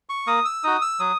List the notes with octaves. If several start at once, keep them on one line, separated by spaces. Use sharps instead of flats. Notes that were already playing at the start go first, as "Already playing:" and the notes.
C#6
A#3 D#6
E6
D#4 F#4 D#6
E6
F#3 D#6